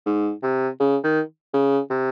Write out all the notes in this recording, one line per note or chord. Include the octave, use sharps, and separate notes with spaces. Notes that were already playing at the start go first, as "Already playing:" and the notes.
G#2
C3
C#3
D#3
C#3
C3